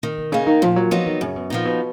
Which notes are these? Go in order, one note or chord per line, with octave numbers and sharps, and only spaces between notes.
D#3
B2
C#3 A#3 D#4
D#3
A#2 F3
F#3
F3 F#3 B3 D#4
D#3
F#2 C#3
B2
A#2 F3 B3 D#4
B2